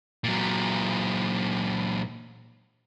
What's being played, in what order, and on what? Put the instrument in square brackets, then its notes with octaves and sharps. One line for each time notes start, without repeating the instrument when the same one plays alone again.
[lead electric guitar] A#2 F#3